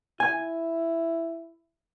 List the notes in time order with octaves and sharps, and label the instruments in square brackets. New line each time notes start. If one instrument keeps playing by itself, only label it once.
[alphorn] E4 [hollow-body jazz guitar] G#5